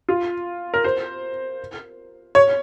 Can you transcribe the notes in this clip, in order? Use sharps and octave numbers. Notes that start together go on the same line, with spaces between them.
F4
A#4
C5
C#5